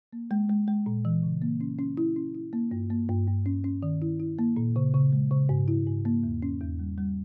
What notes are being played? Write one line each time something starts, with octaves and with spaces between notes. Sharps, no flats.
A#3
G#3
G#3
G#3
A#2
E3
C#3
A#3
C#4
C#4
E4
C#4
E4
A#3
G2
A#3
G2
G2
C#4
C#4
D#3
E4
E4
A#3
A#2
C#3
C#3
G#3
C#3
G#2
E4
G#2
A#3
E2
C#4
E2
G3
G3